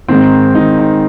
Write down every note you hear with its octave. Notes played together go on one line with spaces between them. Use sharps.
G#2 D#3 C4
G#2 D#3 D#4
D#4